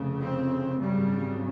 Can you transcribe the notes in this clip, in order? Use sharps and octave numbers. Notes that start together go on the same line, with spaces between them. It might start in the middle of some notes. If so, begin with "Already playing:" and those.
Already playing: F1 F2 C#3
C4
G#1 F#2 C#3 G3